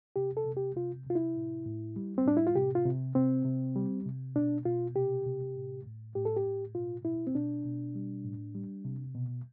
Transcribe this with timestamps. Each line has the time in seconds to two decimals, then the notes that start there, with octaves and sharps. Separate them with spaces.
0.16 C3 G4
0.37 A4
0.47 C3
0.57 G4
0.76 C3 F4
1.06 C3 F4
1.15 E4
1.36 A2
1.66 A2
1.96 G3
2.18 C4
2.26 A2 D4
2.37 E4
2.47 F4
2.56 C3 G4
2.75 F4
2.85 C3
3.15 C3 C4
3.45 C3
3.76 G3
4.06 C3
4.36 B2 D4
4.65 B2 F4
4.95 C3 G4
5.26 C3
5.56 A2
5.86 A2
6.15 A2 G4
6.25 A4
6.36 G4
6.46 A2
6.75 B2 F4
7.05 B2 E4
7.27 C4
7.35 B2 D4
7.66 B2
7.95 G3
8.25 A2
8.55 G3
8.85 C3
9.14 B2